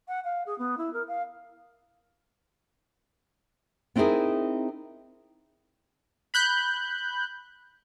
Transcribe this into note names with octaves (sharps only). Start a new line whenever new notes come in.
F#5
F5
G#4
B3
E4
A#4
F5
B3 C4 D#4 E4 G#4 A#4
B5 F#6 G6